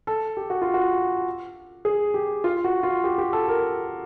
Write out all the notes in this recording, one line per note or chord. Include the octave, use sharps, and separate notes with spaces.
A4
G4
F#4
F4
F#4
G#4
G4
F4
F#4
F4
G4
G4
A4
A#4